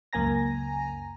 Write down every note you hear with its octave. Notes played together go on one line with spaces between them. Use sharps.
C#2 F#2 A#3 G#5 A#5 A#6